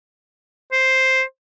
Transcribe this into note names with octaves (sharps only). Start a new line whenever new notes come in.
C5